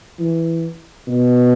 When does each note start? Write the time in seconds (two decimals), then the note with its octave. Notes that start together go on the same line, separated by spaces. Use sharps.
0.19 E3
1.08 B2